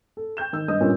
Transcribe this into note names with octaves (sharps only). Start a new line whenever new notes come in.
A4
G5 C#6 G6 E7
D#3 E6
G2 D#5 D#6
G2 A#2 C#4